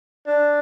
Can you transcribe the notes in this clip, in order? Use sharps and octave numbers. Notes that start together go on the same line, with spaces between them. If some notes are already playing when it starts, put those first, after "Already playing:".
D4